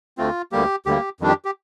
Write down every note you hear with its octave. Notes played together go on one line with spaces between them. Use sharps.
D2 D3 A3 C4 F4
D2 D3 G3 A#3 G4
D2 D3 G3 A#3 G4
F2 D#3 G3 D4
G4
G4